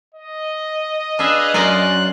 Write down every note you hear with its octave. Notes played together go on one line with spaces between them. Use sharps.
D#5
D4 G#4 B4 E5 F5
F#2 A#4 D5 F5 C6 F#6